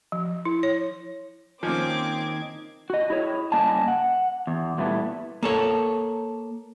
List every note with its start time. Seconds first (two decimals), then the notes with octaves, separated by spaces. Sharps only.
0.12 F3
0.45 E4
0.63 C#5
1.63 D#3 F3 A#3 C4 C#4 D#4 D6 G#6
2.90 F#4 D#5
3.10 E4 G#4 C#5
3.52 G2 C#3 A#3 D#5 G#5 A5
3.88 F#5
4.47 E2
4.78 A#2 F#3 G3 A3 B3 E4
5.43 A#3 A4 C#5